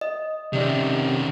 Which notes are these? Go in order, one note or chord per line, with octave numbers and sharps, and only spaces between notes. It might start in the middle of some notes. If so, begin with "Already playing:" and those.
D#5
C3 D#3 C#4 G4 D5